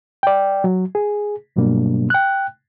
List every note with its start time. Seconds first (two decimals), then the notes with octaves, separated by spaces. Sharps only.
0.23 D5 G5
0.64 F#3
0.95 G#4
1.56 G2 B2 F#3 G3 A#3 D4
2.10 G5 F#6